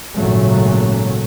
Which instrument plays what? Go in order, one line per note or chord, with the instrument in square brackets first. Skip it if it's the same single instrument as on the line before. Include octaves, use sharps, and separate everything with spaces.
[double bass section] G#1 A#2 C#3 F#3 A3